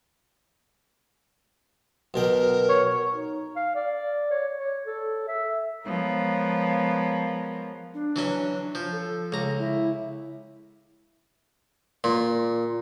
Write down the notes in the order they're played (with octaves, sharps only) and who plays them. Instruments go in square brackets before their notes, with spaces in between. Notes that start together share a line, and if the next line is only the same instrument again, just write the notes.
[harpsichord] B1 B2 G5 [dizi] A#4
[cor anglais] C#5
[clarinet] D#4
F5
D5
C#5
C#5
A4
E5
[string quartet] F3 G#3 B3 A#4 C#5
[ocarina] D4
[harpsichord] E3 F#3 C#4
F3
[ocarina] A4
[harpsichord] C#2 A#5
[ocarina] E4
[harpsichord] A#2